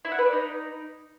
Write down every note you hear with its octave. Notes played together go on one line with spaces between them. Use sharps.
E4
F#5
B4
D5
D#4